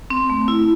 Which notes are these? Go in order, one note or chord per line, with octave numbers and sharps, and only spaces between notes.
C4
A3
E4